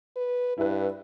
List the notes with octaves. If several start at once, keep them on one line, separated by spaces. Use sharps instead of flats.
B4
G2 E4 B4